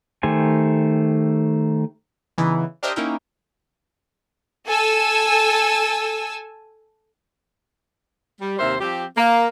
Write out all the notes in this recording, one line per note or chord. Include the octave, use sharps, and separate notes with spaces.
D#3 A3 G4 C5 G#5
C#3 E3 B3 D#4 E4
D4 G4 A#4 C5 D#5 E5
A#3 C#4 D#4 E4 A#4 G5
A4 G#5 E6
G3
D#2 C3 A#4 C5 E5
F3 C4 G4
A#3